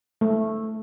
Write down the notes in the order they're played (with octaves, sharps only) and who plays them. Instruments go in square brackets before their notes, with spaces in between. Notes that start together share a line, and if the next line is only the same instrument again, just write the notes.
[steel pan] A3